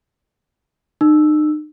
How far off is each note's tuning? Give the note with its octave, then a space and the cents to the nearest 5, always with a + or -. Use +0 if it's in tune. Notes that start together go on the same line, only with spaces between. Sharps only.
D#4 -40 E6 +0